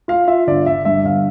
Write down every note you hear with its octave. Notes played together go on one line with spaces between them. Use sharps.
F4 F5
F4 E5
G1 D5
G1 E5
G2 E5
G1 F5